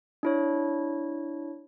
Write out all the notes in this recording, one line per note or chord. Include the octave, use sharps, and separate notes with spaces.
D4 E4 C#5